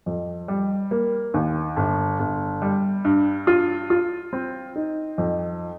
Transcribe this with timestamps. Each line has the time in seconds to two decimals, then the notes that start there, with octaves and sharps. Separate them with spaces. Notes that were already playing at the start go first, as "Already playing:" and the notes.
0.06 F2
0.48 G3
0.91 A#3
1.34 D#2
1.76 G1
2.19 G1
2.62 G3
3.05 G2
3.47 F4
3.90 F4
4.33 C4
4.76 D#4
5.18 F2